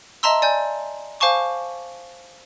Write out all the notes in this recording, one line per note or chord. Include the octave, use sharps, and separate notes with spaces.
D#5 E5 A5 A#5 C6 E6
D5 G#5 G6
C5 F5 G#5 A5 C#6 D6